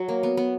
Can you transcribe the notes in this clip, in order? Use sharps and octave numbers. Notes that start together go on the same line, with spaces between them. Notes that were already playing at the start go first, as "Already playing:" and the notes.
Already playing: F#3
A#3
B3
B3